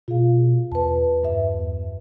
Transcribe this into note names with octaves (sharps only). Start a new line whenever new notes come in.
B2 F4 G#4 F5
E2 B4 A5
G2 E5